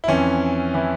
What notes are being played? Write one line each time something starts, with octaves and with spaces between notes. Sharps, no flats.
E4
F2 E3 C#4
E3 E4